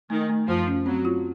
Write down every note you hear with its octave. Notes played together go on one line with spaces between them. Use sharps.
D#3 A3
A3
F#2 F3
C#4
F#3 C4
F4